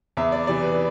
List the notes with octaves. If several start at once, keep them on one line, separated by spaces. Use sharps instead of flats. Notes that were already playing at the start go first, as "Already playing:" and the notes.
E2 E5
D5
C3 E3 D5
B4